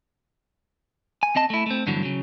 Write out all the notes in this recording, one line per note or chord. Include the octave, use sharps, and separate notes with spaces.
G#5
C4 D#5 A5
A3 E4
A3 C4
G2 D3 E3 F#3 B3
C#3 F#3